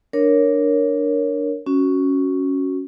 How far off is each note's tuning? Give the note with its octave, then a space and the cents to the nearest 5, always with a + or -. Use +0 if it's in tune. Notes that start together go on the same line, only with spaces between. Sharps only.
D4 +0 A#4 +0 C#5 +0
C#4 +0 F#4 +0